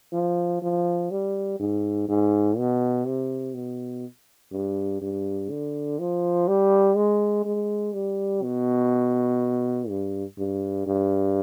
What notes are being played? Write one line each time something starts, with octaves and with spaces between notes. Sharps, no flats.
F3
F3
G3
G#2
G#2
B2
C3
B2
G2
G2
D3
F3
G3
G#3
G#3
G3
B2
G2
G2
G2